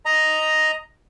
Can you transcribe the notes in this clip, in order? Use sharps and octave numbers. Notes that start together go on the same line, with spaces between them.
D#5 A#5